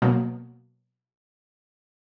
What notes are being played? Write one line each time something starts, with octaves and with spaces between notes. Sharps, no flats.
B2 F#3 A#3 B3